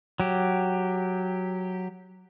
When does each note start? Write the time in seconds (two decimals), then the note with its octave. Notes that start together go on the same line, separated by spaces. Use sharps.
0.20 F#3 G4